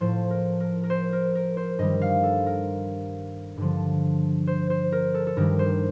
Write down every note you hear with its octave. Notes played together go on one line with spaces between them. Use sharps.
A2 F3 C5
A#4
A#4
A#4
C5
A#4
A#4
C5
G2 D#3 G3 D#5
F5
A4
A#4
G2 D3 F3
C5
C5
A#4
A4
A4
G2 D#3 G3 A#4
C5